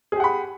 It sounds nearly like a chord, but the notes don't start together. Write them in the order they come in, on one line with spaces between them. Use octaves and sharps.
G#4 G4 F#5 B5